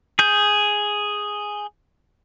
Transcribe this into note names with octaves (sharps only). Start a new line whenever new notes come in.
G#4 G6